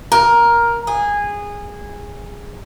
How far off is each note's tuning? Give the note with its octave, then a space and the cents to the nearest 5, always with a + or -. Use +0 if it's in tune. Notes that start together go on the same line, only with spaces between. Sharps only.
A#4 +10
G#4 -15